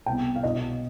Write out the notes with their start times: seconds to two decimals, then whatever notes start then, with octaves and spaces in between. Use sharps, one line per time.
0.06 C2 B2 B3 G5
0.36 F5
0.43 B1 B2 B3 D#5